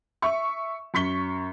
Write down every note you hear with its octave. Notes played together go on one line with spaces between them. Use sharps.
E5 C#6
F#2 C#6 B6 G7